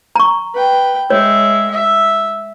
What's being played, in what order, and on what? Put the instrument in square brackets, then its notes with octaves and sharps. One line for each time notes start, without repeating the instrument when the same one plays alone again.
[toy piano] A#5 C#6
[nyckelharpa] B4 G5
[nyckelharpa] G#3 E5 [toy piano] C#5
[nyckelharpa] E5